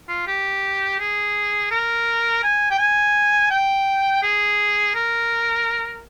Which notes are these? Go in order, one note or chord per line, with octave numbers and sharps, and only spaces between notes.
F4
G4
G#4
A#4
G#5
G5
G#5
G5
G#4
A#4